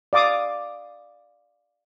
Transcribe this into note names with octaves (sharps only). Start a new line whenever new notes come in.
D5 F5 D6 D#6